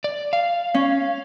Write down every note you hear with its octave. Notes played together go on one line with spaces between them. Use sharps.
D5
F5
C#4